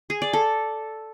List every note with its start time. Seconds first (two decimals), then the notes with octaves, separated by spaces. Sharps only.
0.10 G#4
0.22 D5
0.33 A4